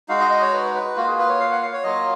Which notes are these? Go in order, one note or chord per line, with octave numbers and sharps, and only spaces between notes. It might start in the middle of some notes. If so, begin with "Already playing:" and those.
G#3 D#4 F#4 F5
D#5
D#5
C#5
B4
B4
A#3 F4 F#4
G#4
B4
C#5
F5
F#5
F5
C#5
F#3 A#3 F4 D#5